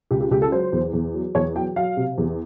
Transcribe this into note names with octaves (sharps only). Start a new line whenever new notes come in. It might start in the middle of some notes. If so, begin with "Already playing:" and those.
C#2 G4
G4
C#2 G4
A4
F#3 C5
E2
E2
F#3
E2 C#5
F#3 G5
F#3 F5
C3
E2